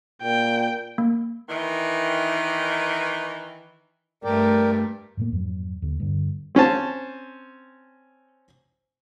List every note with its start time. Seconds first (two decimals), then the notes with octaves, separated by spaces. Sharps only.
0.23 A#2 G5
0.98 A#3
1.49 D#3 E3
4.24 G2 A3 A#4 D5 G5
5.17 F#2 A2 A#3
5.32 F2 G#2 F#3
5.82 D#2 D3
6.00 G2 D3
6.55 C4 C#4 C5 A5